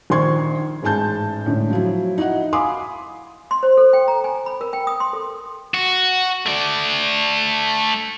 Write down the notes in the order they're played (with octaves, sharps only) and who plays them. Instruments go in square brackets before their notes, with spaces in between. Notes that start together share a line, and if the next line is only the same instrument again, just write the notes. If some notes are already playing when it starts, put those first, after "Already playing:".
[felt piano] A#1 D#3 C5 C6 C#6 G#6
A1 G#2 G#3 A5 G6
A2 D3
F3 F#3 E4
D#4 E4 F#4 D#5 F#5
F5 G#5 B5 C6 D6 D#6
[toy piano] C6
C5
A4
G5
A#5
G#5
B5
A#4
G5
D#6
C6
A4
[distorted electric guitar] F#4
A3 D5